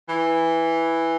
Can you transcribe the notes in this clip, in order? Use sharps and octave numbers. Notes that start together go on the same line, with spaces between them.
E3